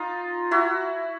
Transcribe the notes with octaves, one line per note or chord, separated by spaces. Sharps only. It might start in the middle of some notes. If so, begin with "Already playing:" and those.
Already playing: D#4 F4
E4 F#4